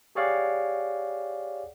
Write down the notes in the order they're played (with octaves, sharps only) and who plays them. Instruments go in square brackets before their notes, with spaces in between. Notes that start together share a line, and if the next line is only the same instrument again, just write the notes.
[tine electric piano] G4 G#4 C#5 D5 F5 F#5